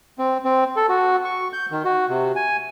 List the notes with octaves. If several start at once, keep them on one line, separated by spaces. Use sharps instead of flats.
C4
C4
A4
F#4
C#6
G6
D#3
F#4
C3
G#5